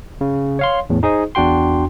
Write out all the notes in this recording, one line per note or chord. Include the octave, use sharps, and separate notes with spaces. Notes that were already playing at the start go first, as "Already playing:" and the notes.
C#3
C#5 F5 C6
E2 A2
D#4 G#4 C5 D#5
E2 D4 F#4 G5 C6